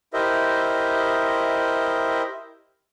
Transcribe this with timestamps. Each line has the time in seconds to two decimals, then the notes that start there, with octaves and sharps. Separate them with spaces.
0.13 E4 G4 A#4 C5 D#5 E5